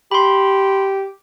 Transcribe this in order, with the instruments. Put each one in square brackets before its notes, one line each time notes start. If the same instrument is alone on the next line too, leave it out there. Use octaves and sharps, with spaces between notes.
[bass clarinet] G4 [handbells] B5 C6